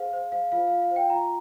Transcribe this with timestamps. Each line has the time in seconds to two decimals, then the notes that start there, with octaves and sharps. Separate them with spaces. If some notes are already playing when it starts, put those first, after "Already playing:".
Already playing: G#4 C5 F5
0.13 C5
0.32 C5 F5
0.52 F4 F5
0.67 F4 F5
0.82 F5
0.91 C5
0.96 G5
1.10 F4 A#5